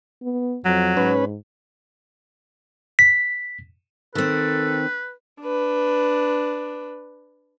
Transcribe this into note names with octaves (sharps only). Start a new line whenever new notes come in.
B3
F2 F#3
G#2 C#4 B4
B6
D#3 C4 A4 B4
D4 B4